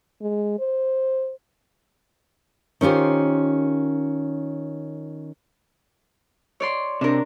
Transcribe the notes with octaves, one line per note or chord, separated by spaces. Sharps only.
G#3
C5
D#3 C#4 F4 G4 C5
C#5 D5 C6
C3 D4 A#4